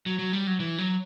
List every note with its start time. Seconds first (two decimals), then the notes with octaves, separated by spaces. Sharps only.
0.06 F#3
0.19 F#3
0.33 G3
0.47 F#3
0.60 E3
0.78 F#3